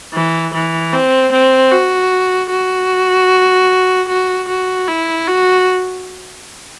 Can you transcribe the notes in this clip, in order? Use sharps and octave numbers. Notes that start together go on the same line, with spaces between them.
E3
E3
C4
C4
F#4
F#4
F#4
F#4
E4
F#4